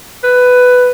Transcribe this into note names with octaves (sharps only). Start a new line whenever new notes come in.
B4